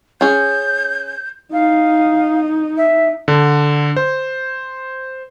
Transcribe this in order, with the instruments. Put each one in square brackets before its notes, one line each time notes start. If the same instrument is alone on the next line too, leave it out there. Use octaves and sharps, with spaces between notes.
[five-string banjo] C#4 G#4 [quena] G6
[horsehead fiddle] D#4 [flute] F5
[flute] E5
[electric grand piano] D3
C5